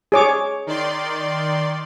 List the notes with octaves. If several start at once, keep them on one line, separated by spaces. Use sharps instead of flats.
G#4 C#5 D6
D#3 D5 C6